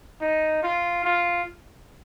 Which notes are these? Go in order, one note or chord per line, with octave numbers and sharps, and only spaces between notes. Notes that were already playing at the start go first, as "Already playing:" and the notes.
D#4
F4
F4